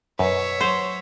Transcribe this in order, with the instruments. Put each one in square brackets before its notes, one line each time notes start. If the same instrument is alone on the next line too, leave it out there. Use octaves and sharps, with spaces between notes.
[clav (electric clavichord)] F#2 [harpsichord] B2 [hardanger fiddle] C#5 E5
[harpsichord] F#3 [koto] C5